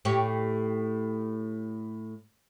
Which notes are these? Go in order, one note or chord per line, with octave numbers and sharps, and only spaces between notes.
A2 G4 C#5